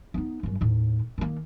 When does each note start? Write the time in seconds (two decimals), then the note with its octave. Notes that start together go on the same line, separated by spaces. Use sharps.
0.14 B3 D#4
0.43 G1 F#2
0.61 D#2 A2
1.18 D#3 A#3